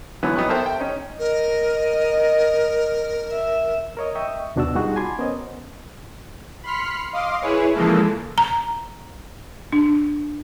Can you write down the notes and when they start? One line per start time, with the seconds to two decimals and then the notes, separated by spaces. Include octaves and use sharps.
0.23 D3 E3 F#3 B3
0.36 F#3 B3 D#4 G5 C#6 F#6
0.49 A4 A#4 C5 E5 G5 A5
0.66 G5
0.80 C#4 D#4
1.19 A#4 D#5
3.31 E5
3.97 A#4 C#5 D#5
4.15 D#5 E5 G5 C#6 D#6
4.56 D#2 B2 D4 F#4 D5 E6
4.75 G3 D#4 F4 F#4 G#4
4.96 G#5 A5 B5 C6 D6 G#6
5.19 B3 C#4 A#4 C5 C#5 D#5
6.63 B5 C6 F6 B6 C#7
7.13 D#5 F5 C6 D6
7.41 E4 G#4 B4 C#5
7.74 C#3 E3 F3 G#3 A#3 A4
8.38 A#5
9.72 D4